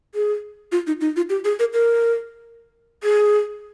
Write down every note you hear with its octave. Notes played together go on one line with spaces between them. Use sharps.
G#4
F4
D#4
D#4
F4
G4
G#4
A#4
A#4
G#4